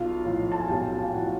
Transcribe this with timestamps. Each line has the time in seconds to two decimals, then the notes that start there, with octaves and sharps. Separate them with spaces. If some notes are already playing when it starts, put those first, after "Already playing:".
Already playing: B1 F4 F5
0.25 A2 F3
0.52 A5
0.60 G#5
0.69 B1 G4 G5
1.03 F5
1.14 A2 F3 F#4 F#5